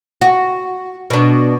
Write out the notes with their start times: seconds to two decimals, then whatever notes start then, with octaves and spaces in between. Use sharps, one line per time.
0.21 F#4
1.10 B2 D4